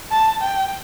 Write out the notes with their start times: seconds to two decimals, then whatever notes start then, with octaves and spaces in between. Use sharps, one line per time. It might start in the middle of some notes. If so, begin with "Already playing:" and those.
0.11 A5
0.42 G5